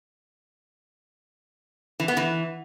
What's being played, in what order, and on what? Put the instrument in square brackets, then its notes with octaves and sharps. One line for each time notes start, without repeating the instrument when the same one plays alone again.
[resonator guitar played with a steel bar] E3
B3
E3